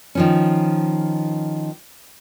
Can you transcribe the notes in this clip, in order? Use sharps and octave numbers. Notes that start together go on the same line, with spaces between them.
D#3 F3 C#4